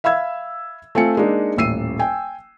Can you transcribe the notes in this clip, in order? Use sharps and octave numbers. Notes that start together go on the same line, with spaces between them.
E5 F5 B5 E6 G#6
A3 C4 F4 G#5 C#7
G#3 A#3 D4 D#4
D#1 A1 E6 C7 D#7
G5 G#5